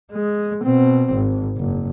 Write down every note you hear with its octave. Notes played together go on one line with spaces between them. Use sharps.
G#3
B2 C4
G#1
F#1